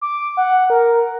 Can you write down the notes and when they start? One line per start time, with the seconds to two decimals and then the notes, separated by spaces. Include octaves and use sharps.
0.01 D6
0.37 F#5
0.70 A#4